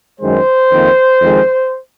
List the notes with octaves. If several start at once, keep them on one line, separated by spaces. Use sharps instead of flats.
F#2 D#3 G#3 C5
F2 D#3 A#3
F2 D#3 G#3